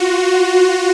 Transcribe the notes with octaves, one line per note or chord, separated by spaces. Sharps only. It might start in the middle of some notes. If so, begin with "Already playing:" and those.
Already playing: F4 F#4